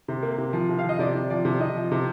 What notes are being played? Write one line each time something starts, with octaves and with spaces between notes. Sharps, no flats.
C3
A#3
C3
F3
C3
F5
F3 D#5
C3 D5
C3
F3 D5
C3
C3 D#5
F3
C3